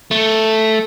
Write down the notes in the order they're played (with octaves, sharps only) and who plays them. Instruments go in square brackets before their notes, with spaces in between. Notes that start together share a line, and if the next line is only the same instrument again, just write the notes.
[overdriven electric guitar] A3